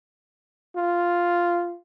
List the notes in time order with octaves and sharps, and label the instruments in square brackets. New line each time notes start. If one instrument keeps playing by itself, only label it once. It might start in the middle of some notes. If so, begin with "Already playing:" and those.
[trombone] F4